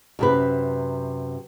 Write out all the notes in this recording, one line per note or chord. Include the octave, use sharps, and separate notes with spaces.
F#2 C3 B4